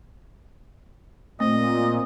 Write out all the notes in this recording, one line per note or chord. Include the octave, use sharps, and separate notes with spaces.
A#2 A3 C4 D#5